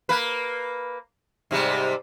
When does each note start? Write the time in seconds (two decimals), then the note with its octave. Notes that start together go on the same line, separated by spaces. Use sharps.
0.09 A#3 B4
1.51 G#2 C3 G3